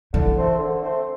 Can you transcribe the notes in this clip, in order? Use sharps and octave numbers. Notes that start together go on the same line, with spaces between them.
D3 E3
A3 C4 A4 C5
D3
A3 C4 A4 C5